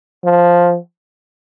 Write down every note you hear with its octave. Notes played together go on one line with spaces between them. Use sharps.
F3